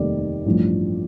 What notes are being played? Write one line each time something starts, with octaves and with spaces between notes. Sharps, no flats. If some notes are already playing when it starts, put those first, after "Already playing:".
Already playing: F1 D#2 D#3 G3 D5
A1 G2 F3